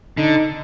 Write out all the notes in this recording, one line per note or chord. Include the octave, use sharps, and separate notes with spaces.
D3 D#4